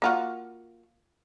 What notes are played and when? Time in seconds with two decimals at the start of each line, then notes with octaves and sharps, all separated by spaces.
0.02 A#3 F4 F#4